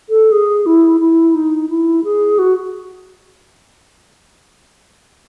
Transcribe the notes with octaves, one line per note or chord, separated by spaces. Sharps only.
A4
G#4
E4
E4
D#4
E4
G#4
F#4